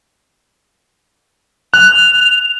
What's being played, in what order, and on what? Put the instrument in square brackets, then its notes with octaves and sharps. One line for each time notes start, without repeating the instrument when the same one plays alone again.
[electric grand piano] F#6 [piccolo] F7